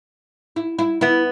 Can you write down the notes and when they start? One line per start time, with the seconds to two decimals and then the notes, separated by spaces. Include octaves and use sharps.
0.56 E4
0.79 E4
1.01 B3 E4